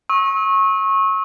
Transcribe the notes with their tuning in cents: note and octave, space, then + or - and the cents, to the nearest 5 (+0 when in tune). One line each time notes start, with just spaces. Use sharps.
C#6 -25 E6 -40